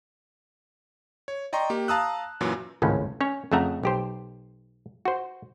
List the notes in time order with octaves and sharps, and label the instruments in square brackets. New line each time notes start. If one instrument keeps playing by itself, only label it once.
[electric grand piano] C#5
D5 D#5 G5 A#5 C6 C#6
A#3 G4
F5 A5 A#5 D#6 E6 F#6
F#2 A#2 E3 F#3
[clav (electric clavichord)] G#1 C#2 A2 C#4
C#4 C#5
F2 C#3 A3 E5 F#5 A#5
B1 G4 C5
F#4 C5